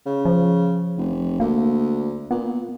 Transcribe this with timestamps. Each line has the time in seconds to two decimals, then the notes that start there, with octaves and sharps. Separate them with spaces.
0.06 C#3
0.25 F3
0.97 F1
1.40 D2 A#3
2.31 A#2 B3